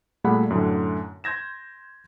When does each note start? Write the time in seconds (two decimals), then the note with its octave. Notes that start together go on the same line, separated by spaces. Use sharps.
0.24 A#2 G3 A3 G#4 F#5 B5
0.50 F#2 A2 D3
1.24 C6 G6 G#6 A#6 E7